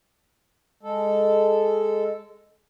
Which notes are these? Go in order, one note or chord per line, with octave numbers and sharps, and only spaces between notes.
G#3 A4